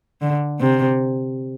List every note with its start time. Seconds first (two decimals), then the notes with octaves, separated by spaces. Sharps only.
0.21 D3
0.60 C3